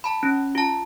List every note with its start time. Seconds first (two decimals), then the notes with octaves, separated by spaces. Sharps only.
0.04 A5 B5
0.23 C#4
0.55 F4 A5